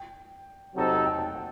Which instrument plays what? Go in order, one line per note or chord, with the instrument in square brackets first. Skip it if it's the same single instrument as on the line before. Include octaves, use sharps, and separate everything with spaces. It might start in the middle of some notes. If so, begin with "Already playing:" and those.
Already playing: [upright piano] G5
[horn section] C3 F#3 C4 D#4 A4 [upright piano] D#5
[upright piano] F#5
G5
A5
G5